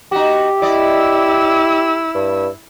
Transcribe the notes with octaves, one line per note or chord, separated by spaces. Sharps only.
D#4 F#4 G4
E4 D5 D#5 E6
G2